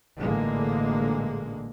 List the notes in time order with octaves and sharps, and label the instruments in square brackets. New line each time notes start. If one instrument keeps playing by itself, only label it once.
[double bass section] A1 A#2 D3 G#3 A#3